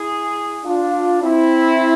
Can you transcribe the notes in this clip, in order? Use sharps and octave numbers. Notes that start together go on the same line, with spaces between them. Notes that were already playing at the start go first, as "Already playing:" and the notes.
Already playing: E4 G#4
D4 F4
C4 E4